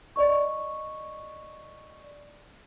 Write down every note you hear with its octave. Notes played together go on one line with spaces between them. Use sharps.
D5 D#5 C#6